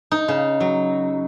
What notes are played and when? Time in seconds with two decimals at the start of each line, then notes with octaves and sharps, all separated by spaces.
0.11 D#4
0.28 C#3
0.60 F#3